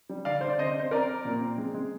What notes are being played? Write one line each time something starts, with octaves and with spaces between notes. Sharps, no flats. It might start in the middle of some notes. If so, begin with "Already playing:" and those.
G3
D3 D5 F5
D3 C5
D5
C3 C5 D#5
C3 C5
C3 A#4 D5
C4
A#2
C4
G#3
G#3